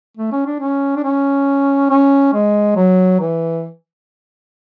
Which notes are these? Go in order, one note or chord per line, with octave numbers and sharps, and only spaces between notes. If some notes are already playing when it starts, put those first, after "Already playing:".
A3
C#4
D4
C#4
D4
C#4
C#4
G#3
F#3
E3